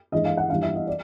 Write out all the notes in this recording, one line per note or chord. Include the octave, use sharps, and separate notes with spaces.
G2 E3 G#3 D#5
F5
F#5
G2 E3 G3 F5
E5
D#5
D5